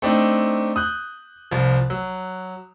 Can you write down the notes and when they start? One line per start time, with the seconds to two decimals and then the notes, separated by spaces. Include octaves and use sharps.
0.02 A3 C4 D4 D#4
0.76 D#6 F#6 G6
1.51 C2 F3
1.90 F#3